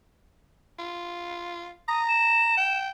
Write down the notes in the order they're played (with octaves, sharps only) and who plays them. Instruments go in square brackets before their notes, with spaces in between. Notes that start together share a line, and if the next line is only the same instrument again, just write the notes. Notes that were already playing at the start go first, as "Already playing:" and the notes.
[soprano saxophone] F4
[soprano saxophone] A#5 [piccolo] D#6
[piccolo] E7
[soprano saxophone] G5